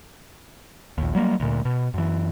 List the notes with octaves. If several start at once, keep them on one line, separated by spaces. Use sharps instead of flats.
A#1 D#2
F#3 G3 A#3
D2 A#2
B2
F#2 E3